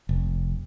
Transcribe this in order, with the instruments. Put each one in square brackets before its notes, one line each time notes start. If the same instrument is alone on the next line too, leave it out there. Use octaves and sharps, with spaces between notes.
[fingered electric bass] F1